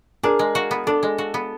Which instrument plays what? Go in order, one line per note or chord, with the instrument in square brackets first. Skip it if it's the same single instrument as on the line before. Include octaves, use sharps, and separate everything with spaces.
[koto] D4 [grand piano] G#4 A#4
[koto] G#3
F#4
B3
[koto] D4 [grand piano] A4
[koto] G#3
F#4
B3